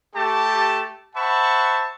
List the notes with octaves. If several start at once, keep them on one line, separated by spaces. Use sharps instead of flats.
A3 G4 A5
C5 E5 F#5 A5 B5 C#6